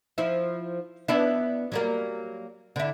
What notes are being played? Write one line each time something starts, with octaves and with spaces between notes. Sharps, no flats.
F3 E4
B3 D4 E4
F#3 G3 A#3
D3 E4